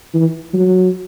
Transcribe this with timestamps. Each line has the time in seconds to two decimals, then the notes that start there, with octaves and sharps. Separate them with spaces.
0.14 E3
0.53 F#3